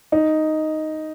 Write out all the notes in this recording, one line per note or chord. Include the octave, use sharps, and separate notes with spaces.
D#4